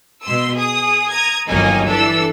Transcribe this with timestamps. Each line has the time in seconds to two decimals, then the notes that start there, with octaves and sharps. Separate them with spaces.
0.23 B2 C6 E6
0.54 G#4 D#6
1.09 A#5 D#6 G#6
1.48 G1 D#3 F#3 A#3 D#4 G#5
1.86 E3 D4 A4 E6